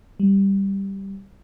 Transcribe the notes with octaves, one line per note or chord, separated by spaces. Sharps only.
G3